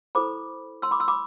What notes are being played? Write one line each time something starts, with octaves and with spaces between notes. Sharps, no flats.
E4 A4 C5 B5 D6
C6 E6
B5 D6
C6 E6
B5 D6